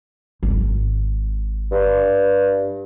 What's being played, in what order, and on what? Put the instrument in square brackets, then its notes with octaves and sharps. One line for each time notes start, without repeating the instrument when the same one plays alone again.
[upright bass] G#1
[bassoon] G2